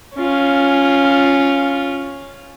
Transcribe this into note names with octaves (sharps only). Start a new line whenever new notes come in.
C#4 F4